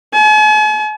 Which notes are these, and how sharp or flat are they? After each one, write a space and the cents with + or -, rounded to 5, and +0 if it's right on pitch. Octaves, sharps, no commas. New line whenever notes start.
G#5 +45